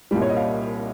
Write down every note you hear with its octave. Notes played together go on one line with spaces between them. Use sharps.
C2 A#2 G3
C#5
D#5
F5